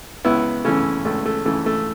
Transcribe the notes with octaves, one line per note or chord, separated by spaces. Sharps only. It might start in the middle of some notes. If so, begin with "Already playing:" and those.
C#2 B3 E4
C#3 E3 A3 C#4
C#2 A3
A3
C#3 E3 A3
A3